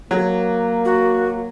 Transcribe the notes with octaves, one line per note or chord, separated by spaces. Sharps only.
F#3 A#3
F#4